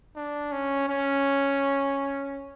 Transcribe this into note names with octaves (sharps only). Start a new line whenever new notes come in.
D4
C#4
C#4